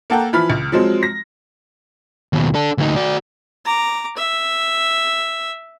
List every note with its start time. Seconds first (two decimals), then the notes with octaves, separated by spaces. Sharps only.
0.10 A#3 A4 F#5 G5 A#5
0.33 E3 F3 B5 F6
0.50 C#2
0.72 F3 F#3 G#3 C4
1.03 A#6
2.33 D#2 B2
2.54 D4 A4
2.78 D2 D#4
2.96 F#4 D5
3.66 A#5 D6
4.17 E5